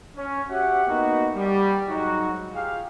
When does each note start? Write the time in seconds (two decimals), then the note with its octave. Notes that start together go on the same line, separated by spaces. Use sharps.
0.16 C#4
0.48 F#4 G4 C#5 E5 F#5
0.87 A#3 B3 D#4 F#4
1.35 G3
1.88 G#2 F#3 D#4 F#4
2.53 F4 G4 G#4 F5